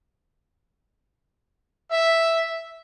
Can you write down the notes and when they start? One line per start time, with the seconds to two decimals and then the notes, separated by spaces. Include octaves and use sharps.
1.90 E5